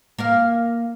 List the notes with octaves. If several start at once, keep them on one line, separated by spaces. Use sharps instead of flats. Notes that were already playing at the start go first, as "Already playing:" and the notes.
A#3 A#4 F5